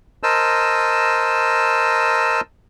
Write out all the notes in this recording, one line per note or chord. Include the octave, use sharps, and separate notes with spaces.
A#4 C5 D#5 A5 E6